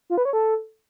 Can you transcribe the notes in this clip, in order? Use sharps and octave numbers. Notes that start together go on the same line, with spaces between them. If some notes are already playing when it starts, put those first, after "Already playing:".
F4
B4
C#5
A4